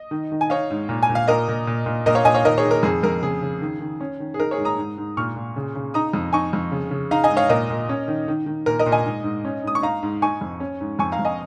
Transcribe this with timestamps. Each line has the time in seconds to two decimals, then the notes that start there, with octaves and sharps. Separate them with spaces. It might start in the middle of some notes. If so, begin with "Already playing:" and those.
Already playing: D#5
0.11 D#3
0.32 D#3
0.41 G#5
0.50 D#4 C#5 F5
0.70 G#2
0.89 A#2
1.03 G#5
1.09 A#2
1.15 F5
1.28 A#2 A#4 D#5
1.48 A#2
1.67 A#2
1.86 A#2
2.06 A#2 A#4 D#5
2.15 C#5 F5
2.25 A#2 D#5 G#5
2.34 C#5 F5
2.45 D#3 A#4 D#5
2.58 G#4 C#5
2.64 D#3
2.71 A#4
2.83 F2 G#4
3.03 F2 A#4
3.22 C#3 G#4
3.42 C#3
3.62 D#3
3.80 D#3
4.00 C#4
4.20 D#3
4.34 G#4
4.39 D#4 A#4
4.51 G#4 C#5
4.58 G#2
4.65 A#5 D#6
4.78 G#2
4.97 G#2
5.17 A#2 C#6 F6
5.36 A#2
5.56 C#3
5.75 C#3
5.94 D#4 A#5 D#6
6.13 F2
6.33 D#4 G#5 C#6
6.53 F2
6.71 C#3
6.91 C#3
7.11 D#4 F5 A#5
7.24 D#5 G#5
7.30 G#2
7.37 C#5 F5
7.49 A#2 A#4 D#5
7.70 A#2
7.89 C#4
8.08 D#3
8.28 D#3
8.46 D#3
8.66 A#2 A#4
8.79 A#4 D#5
8.86 A#2
8.92 D#5 G#5
9.05 G#2
9.24 G#2
9.45 C#4
9.63 G#2 D#6
9.75 C#6
9.82 D#4 F5 A#5
10.03 G#2
10.22 D#4 G#5 C#6
10.41 F2
10.60 C#4
10.81 G#2
10.99 F2 G#5 C#6
11.12 F5 A#5
11.19 F2
11.25 D#5 G#5